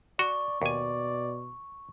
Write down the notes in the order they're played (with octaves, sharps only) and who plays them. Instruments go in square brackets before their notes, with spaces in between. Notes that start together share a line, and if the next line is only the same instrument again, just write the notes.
[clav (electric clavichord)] F#4 [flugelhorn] D5 [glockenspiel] C#6
[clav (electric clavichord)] D#2 G#5 [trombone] B2 [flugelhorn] D5